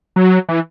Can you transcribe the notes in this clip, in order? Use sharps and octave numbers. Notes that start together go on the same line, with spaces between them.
F#3
E3